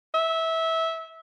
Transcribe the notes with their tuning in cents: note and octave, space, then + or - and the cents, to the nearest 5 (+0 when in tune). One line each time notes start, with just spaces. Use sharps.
E5 -20